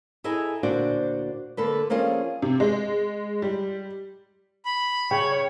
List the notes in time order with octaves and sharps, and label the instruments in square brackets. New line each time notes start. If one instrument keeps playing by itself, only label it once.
[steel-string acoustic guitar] E4 G#4 A4 D#5 G#5 A#5
D2 A#2 D4 F#4 C5 D5
D3 A#3 A4 B4
F3 A#3 C#4 F4 G#4 D5
[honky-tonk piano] C3
G#3
G3
[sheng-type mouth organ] B5
[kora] C#3 [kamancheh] C#5 [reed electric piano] G5